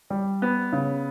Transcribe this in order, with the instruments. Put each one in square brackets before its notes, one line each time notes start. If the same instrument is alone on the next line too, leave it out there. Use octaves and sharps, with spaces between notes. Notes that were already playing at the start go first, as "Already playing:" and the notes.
[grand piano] G3
B3
C#3